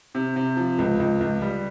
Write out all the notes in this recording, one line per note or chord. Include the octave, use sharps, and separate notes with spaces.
C3
C3
F3
C#2
C#2
C#2
G3